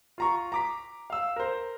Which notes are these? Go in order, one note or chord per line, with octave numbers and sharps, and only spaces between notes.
F4 A#5 C#6
A#5 D6 B6
F5 E6
A#4 C5